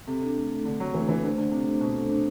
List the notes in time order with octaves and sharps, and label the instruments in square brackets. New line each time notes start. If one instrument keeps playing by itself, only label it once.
[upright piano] C3 [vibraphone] A4
[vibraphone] D4
A3
A3
[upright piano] D3 [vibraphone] A4
[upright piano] F#3 [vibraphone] D4
[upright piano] E3 [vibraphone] A3
[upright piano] E3 [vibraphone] A3
[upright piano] D3 [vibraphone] C5
[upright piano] D3 [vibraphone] A4
[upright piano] C3 [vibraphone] D4
[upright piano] C3 [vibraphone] D4
[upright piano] B2 [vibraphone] C5
[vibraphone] A4
D4